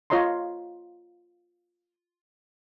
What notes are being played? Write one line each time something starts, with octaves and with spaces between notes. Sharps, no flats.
F4 C#5 D#5 A#5 C6